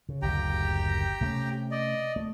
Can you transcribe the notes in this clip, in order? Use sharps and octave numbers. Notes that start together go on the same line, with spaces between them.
C#3
F#1 D2 G4 G5 A#5
C3 A3 C#4
D5 D#5
A3